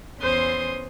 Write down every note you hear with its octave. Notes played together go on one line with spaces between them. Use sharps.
E2 C#4 C5 C6 D#6